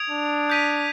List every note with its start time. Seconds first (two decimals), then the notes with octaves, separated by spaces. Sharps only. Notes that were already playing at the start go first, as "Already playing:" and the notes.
Already playing: D#6 G#6 D7 F7
0.10 D4
0.50 D#6 G6 B6 D#7